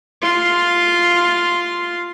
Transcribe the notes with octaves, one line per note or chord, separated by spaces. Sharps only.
F4 C6